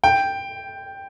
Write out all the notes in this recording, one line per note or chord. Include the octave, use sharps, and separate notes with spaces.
G5